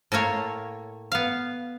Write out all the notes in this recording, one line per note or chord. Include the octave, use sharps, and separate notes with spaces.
A2 A3 A#3 C#5
B3 F5